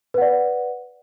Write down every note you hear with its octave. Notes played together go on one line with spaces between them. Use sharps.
B4 D5 F#5